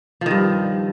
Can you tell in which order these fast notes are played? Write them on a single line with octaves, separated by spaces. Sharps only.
F3 D#3 G2